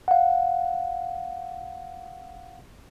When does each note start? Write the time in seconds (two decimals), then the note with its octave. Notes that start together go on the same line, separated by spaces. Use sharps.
0.08 F5 F#5